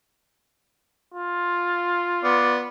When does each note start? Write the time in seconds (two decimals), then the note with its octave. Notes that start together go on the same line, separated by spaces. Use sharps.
1.14 F4
2.24 B3 D5